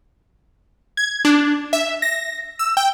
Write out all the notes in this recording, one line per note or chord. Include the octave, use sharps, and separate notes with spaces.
G#6
D4
E5
A#6
E6
G5